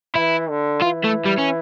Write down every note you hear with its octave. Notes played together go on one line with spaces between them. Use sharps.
E3 E4
D3
E3 F4
A3
G3
C#4